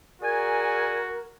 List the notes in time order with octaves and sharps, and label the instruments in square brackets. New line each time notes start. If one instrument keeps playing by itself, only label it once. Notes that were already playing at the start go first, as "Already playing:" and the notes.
[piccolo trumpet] F#4 [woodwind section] G#4 D5 G#5 [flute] A#4